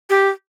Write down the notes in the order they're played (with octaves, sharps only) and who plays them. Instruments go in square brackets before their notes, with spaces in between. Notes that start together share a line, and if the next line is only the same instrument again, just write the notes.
[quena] G4